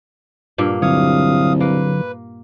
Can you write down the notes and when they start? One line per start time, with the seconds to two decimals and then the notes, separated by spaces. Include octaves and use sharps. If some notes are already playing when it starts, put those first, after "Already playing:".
0.58 G2 A#2 A#3
0.82 C2 D3 F#3 C#5 F5 D#6
1.60 A#3 B4